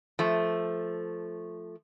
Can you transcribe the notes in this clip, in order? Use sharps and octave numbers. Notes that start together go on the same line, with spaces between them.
F3 A3